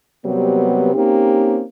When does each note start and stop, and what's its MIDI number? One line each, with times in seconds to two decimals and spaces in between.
0.24 0.93 48
0.24 0.93 54
0.24 0.93 55
0.24 0.93 58
0.24 0.93 59
0.94 1.62 58
0.94 1.62 60
0.94 1.62 61
0.94 1.62 63
0.94 1.62 67